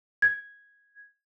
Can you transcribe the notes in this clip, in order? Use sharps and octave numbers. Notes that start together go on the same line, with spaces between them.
G#6